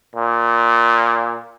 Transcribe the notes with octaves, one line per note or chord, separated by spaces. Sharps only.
A#2